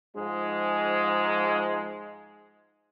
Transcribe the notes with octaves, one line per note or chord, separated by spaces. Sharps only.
G#2 F3 G#3